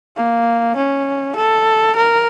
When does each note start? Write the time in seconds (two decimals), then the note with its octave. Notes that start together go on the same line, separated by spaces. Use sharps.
0.16 A#3
0.77 C#4
1.36 A4
1.96 A#4